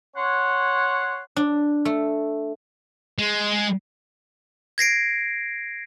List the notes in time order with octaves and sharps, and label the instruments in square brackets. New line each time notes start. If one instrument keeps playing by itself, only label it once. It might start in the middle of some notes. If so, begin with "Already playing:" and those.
[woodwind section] C#5 F#5 C6
[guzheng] D4
A3
[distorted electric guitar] G#3
[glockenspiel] G#6 A#6 C7 D7